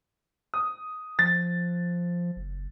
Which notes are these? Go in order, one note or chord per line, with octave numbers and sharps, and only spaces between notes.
D#6
F3 A6
F#1